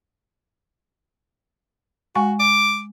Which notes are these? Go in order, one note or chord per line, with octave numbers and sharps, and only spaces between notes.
G#3 F#4 G#5 C#6
D6